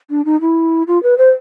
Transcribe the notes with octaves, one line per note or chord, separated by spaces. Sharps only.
D4
D#4
E4
F4
B4
C5